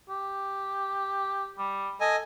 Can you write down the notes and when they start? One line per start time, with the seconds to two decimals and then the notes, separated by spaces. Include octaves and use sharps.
0.09 G4
1.58 G3
2.01 A4 D#5 G#5